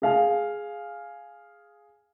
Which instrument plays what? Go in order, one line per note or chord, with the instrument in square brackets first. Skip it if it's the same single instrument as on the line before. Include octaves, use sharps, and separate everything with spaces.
[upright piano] G#4 F5 G#5